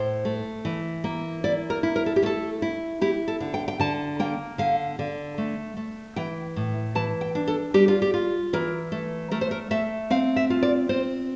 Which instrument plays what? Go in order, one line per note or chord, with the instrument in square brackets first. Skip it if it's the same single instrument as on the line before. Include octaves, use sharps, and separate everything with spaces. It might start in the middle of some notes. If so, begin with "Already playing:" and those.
Already playing: [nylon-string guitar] A2 C5
A3
E3
A#3
E4 D5
A#4
E4
A#4
A4
G4
A3 A4
E4
E4 G4
A4
D3
G5
G5
D3 A5
A#3 G5
D3 F5
D3
A3
A3
E3 G5
A2
E3 A5
G5
D4
A4
G3 G4
F4
G4
F4
E3 A#4
A3
A3 A#4
C5
A#4
A3 E5
C4 F5
E5
F4
D5
C4 C5